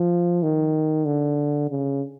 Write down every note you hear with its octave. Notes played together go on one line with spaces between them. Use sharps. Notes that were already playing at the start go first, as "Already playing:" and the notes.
Already playing: F3
D#3
D3
C#3